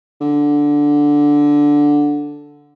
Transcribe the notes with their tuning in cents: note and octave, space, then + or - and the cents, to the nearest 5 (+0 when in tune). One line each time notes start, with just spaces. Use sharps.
D3 -5